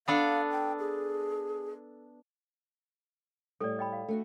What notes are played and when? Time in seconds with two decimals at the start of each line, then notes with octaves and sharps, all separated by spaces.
0.08 B3 D4 A4 F5
0.51 G5
0.79 G#4
3.60 A2 G3 A4 D5
3.79 D#5 G5 B5
3.93 F5
4.08 A3 D4 F#4